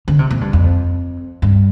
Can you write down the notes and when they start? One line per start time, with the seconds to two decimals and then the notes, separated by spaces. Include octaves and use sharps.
0.08 D3
0.19 C3
0.30 A#2
0.41 G2
0.53 F2
1.42 G2